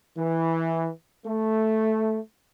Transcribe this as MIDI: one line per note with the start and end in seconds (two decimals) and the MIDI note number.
0.18 0.88 52
1.25 2.18 57